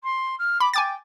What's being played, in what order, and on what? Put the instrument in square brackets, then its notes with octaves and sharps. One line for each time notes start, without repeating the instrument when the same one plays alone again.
[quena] C6
F6
[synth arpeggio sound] B5 [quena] D6
[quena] G5 [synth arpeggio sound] G#5 D6 A6